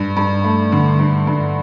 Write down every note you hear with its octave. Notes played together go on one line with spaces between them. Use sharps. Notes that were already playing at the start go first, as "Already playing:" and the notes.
Already playing: G2
G2
A3
D3
G2
G2